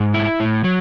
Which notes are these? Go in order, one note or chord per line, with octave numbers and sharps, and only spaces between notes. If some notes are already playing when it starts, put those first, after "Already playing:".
Already playing: G#2
E4
A2
F#3